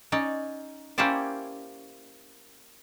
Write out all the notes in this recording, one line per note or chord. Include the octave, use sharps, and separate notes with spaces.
C#4 D#4 D5
A#3 C#4 E4 G4 C5 D5